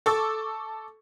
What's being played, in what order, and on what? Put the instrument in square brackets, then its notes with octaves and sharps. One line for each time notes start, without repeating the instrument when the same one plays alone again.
[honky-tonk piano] A4 C#6 D6 E6 A6